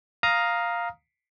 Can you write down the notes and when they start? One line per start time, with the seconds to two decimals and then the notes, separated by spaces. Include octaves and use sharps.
0.23 F5 A#5 D#6